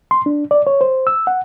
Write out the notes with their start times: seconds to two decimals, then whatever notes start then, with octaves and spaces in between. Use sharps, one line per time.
0.11 C6
0.26 D4
0.51 D5
0.67 C#5
0.81 C5
1.07 E6
1.27 F#5